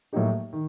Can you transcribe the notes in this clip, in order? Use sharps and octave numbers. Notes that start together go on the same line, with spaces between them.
A2 F#3 A#3 D#4 G4
D#3